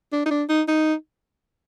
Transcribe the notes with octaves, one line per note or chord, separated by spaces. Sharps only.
D4
D#4
D4
D#4
D#4